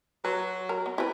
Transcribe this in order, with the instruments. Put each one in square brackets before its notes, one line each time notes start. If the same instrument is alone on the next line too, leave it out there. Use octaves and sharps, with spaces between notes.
[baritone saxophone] F#3 [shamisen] B4
[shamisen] A#4
B3
[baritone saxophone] C4 [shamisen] E4 B4